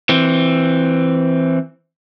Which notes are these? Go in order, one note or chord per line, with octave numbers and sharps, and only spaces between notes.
E3 C4